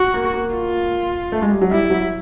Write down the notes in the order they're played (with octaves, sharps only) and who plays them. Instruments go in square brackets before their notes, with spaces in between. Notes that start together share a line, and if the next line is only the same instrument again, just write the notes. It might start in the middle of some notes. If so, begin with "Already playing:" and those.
Already playing: [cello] F#4
[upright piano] A#3
A#3
[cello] F4
[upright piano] A3
G#3
G3
F#3
[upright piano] G3 [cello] E4
[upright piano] F#3